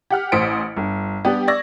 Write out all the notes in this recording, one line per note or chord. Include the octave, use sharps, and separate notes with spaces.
G4 F#5 F6
A1 C5 D#6 B6 C#7 D7
G1
G3 B3 D4 G4
D5 C#6 E6 G#6 A#6